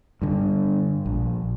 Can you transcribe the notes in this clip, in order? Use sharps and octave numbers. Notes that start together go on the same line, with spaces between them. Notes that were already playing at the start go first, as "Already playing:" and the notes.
G2 D3
A#1